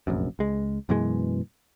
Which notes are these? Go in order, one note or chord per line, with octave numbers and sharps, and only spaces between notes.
F1 A#1 F#2
C#2 G#3
F#2 B2 E3 G#3